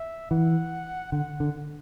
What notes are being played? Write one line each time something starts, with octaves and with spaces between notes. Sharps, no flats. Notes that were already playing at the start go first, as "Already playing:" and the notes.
Already playing: E5
E3 F#5
D3 F#5
D3